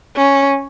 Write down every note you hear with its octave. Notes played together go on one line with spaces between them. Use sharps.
C#4